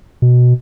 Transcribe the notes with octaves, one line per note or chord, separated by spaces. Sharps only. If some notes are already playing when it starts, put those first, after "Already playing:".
B2